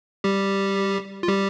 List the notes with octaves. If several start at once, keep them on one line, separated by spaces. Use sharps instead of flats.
G3 G4
F4
G3 G4